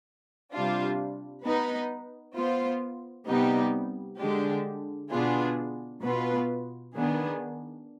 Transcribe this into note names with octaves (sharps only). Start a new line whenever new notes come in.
C3 G3 D4 F4
B3 D#4 B4
B3 F4 C5
C3 G3 B3 D#4 G4
D3 G#3 D4 G4
B2 B3 D4 F4 G#4
B2 B3 F4 B4
D#3 B3 D4 G#4